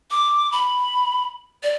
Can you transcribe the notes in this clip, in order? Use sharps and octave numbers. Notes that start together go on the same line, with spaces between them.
D6
B5
D5